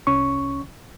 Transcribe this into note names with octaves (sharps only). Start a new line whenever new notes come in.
C2 C#4 C#6